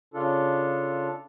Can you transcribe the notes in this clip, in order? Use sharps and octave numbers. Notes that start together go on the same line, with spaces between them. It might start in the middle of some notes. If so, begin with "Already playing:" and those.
C#3 D4 F4 A4